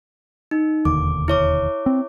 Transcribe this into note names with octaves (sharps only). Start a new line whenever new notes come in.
D#4
E1 D#2 D3 D6
E4 C#5 D6
C4